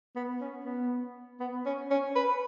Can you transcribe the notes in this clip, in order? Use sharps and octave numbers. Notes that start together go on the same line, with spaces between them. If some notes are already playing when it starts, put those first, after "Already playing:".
B3
C#4
B3
B3
C#4
C#4
B4